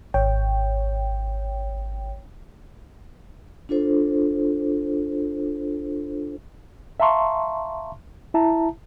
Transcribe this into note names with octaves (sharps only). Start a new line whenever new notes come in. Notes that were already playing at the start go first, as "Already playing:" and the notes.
G#1 C#5 G5
D4 F4 A4 C5
E5 F5 A5 A#5 C6 C#6
E4 E5 A5 A#5